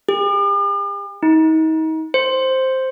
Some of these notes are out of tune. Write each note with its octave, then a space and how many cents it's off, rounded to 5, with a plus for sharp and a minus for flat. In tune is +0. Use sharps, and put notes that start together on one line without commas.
G4 +45
D#4 +35
C5 +5